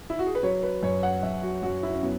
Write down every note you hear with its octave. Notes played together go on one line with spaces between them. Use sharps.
E4
F#4
G#4
B4
F#3 C#5
B4
F#2 C#5
F#5
F#2 E5
F#4
F#2 F#4
E4
C#4
F#3 B3